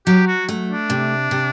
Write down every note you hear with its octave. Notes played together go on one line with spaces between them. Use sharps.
F#3 G4
F#4
A3
D4
C3
C3